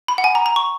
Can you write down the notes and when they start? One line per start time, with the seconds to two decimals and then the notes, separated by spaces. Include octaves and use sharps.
0.08 B5
0.18 F#5
0.24 G#5
0.35 A#5
0.46 A#5
0.56 C#6